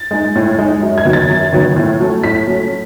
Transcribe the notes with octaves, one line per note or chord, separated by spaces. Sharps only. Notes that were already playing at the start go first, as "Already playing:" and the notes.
Already playing: A6
G#3 D#4
A2
G#3 D#4
F#2
G#6
D#3 F#3 B3
A6
F#2
D#3 F#3 B3
A2
F#3 A3 C#4
A2 B6
F#3 A3 C#4